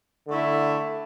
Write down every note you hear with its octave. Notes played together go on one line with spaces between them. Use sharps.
D3 A3 E4